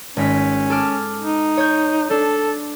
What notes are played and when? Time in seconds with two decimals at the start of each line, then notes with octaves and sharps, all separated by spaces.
0.17 G#1 C#4 B6
0.70 A4 D6 F6
1.21 D#4
1.57 C#5 G6
2.10 D4 A4